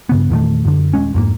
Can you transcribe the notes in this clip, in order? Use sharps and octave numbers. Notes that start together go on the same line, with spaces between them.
G2 C#3 B3
E2 A#2 D#3 A3
F#2 D3
D#1 G#3 C#4
F2 G#2 A#3